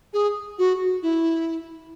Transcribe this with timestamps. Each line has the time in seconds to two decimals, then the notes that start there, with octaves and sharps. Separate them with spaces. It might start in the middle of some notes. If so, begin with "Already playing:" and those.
0.13 G#4
0.58 F#4
1.02 E4